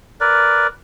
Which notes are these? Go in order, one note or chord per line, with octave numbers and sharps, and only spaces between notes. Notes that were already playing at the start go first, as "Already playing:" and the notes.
A#4 B4 D5